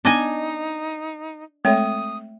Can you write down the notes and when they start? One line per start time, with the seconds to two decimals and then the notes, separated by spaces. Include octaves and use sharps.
0.05 B3 D4 D#4 D#5 G#5
1.65 G#3 A3 C4 A4 C#5 E5 D#6